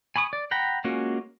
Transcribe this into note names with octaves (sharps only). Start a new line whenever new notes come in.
G#5 B5 C#6 D#6
D5
F#5 G5 A#5 B5
G#3 A#3 C#4 F4 F#4